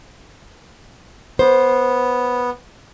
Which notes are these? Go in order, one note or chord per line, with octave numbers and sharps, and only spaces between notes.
B3 C5